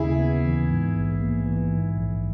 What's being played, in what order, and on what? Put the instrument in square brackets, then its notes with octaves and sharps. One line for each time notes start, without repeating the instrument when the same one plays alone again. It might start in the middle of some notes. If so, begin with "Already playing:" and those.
Already playing: [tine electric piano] D#2 C#3 [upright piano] E4 G#4
[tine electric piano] B3
E3
G#2
A#1
A#3
E3
G#2
A#1